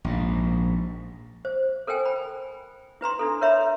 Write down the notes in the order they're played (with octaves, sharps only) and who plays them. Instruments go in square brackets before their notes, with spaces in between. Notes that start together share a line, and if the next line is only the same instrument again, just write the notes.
[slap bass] A#1 G#2
[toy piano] C5
A4 A#4 C5 G5 G#5
B5
E4 B4 A#5 C6
D4 E4 A4
A#4 C#5 E5 A#5 B5